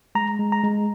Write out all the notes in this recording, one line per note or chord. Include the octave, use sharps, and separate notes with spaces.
G#3 A#5
G#3
A#5
G#3